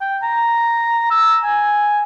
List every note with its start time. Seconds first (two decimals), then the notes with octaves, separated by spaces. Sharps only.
0.01 G5
0.23 A#5
1.11 E6
1.44 G#5